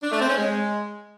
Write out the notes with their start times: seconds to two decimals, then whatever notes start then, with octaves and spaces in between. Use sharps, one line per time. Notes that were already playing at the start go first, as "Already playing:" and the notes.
0.03 D4
0.12 A3
0.21 C4
0.29 C#4
0.38 G#3